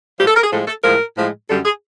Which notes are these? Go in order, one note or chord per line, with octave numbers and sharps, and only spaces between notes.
A2 F3 G#3 G4
A4
A#4
G#4
A2 F3 G#3 A4
A4
A2 F3 G#3 A#4
A2 F3 G#3
F#2 D3 G3 A4
G#4